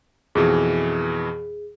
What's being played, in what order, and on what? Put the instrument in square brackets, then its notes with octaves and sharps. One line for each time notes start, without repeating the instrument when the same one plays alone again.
[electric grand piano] F2 B2 E3 [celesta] G#4